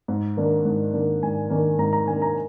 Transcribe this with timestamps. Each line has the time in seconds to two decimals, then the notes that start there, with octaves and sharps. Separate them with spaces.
0.08 G#2
0.37 D#3 A#3 D4
0.65 G#2
0.93 D#3 A#3 D4
1.23 G#2 G#5
1.50 D#3 A#3 D4
1.78 G#2 A#5
1.93 A#5
2.07 D#3 A#3 D4 G#5
2.22 A#5